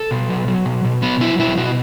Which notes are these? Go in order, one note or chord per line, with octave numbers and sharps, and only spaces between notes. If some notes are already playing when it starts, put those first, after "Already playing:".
Already playing: A4
B2
F#3
F#3
B2
B2
F#3 B3
F#3 E4
B2 E4
B2 F#4